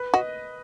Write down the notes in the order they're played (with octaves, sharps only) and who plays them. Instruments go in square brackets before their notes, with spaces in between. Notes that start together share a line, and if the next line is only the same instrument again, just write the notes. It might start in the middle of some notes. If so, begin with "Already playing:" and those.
Already playing: [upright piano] B4
[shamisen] F#4 [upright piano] D#5